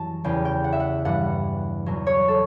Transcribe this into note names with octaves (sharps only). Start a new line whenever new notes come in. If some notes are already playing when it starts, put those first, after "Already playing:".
Already playing: F#2 E3 G3 A5
E2 C#3 G3 G5
G5
F#5
E5
F#5
G2 E3 G3 F#5
E2 B2 F#3
C#5
A4